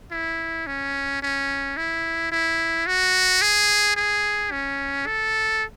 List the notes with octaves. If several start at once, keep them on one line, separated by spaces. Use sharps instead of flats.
E4
C#4
C#4
E4
E4
F#4
G#4
G#4
C#4
A4